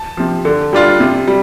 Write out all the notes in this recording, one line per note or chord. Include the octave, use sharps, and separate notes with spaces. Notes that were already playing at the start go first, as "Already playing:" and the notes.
Already playing: A5
C3 F3
D3
G3 D4 F4
C3
G3